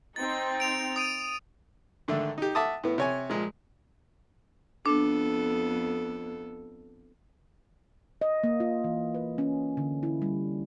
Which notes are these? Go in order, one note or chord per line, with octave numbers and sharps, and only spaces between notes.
C4 D#4 A6
D7 F7
D#6 D7 D#7
G#2 D3 D#3 A3
D#4 G4
E5 F#5 A5 D6 D#6
A2 B3
C3 C#5 G#5
A#2 F3 G#3
F2 B3 D4 A4
D#5
A#3
F4
E3
B4
C#4
D3
E4
G3